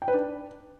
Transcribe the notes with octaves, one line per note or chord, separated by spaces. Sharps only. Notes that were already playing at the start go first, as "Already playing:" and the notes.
G5
B4
D4